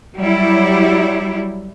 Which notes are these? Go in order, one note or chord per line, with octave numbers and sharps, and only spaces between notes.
F#3 G3 E4